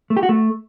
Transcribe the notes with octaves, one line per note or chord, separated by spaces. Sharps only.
A3
G4
F#4
A3